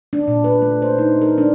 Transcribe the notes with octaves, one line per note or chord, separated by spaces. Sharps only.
D4
A#2
B4
A3
C5
D#4
A#4
D4